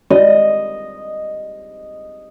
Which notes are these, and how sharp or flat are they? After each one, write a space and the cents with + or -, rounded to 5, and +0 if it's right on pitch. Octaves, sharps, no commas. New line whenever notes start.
D#5 -5